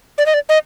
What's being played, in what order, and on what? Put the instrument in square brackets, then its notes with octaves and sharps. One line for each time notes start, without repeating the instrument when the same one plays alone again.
[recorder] D5
D#5
D5
D#5